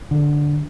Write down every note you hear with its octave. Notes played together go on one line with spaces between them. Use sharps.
D3